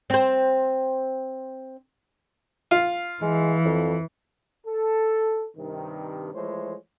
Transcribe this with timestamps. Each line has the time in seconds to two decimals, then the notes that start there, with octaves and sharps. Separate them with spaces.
0.10 C4 C5
2.71 F4
3.22 E3 G#3
3.65 F2
4.67 A4
5.57 G2 C3 D#3
6.34 E3 F3 G#3 A3 C5 C#5